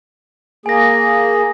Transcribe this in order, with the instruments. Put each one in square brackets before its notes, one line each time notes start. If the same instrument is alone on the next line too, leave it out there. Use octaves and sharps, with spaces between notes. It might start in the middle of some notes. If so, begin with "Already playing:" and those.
[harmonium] A#3 G#4 [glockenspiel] G#5 A#6